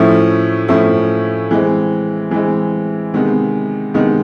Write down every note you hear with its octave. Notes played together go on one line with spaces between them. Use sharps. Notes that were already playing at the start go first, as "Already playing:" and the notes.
Already playing: A2 F3 A3 C#4 E4
A2 F3 A3 C#4 E4
E3 G#3 C4
E3 G#3 C4
C3 D#3 G#3 B3
C3 D#3 G#3 B3